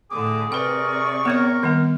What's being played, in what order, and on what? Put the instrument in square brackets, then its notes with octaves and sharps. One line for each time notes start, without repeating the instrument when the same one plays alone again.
[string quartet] A2 D3 [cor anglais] G#4 [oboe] D6
[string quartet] C3 D5 C#6 [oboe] A#4 [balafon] B4 G5
[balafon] B3 C4 C#5 [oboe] A#4
[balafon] D#3 G3 B3